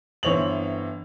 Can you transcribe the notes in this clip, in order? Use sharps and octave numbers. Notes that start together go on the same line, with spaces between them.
G1 E3 C4 C#5 F7 F#7